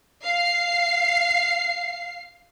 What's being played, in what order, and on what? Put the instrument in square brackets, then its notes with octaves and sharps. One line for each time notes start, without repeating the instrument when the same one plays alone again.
[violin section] F5 C7